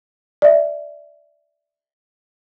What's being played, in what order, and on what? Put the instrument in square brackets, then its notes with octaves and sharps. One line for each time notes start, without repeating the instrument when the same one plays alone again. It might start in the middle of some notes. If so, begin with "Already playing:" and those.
[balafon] D5 E5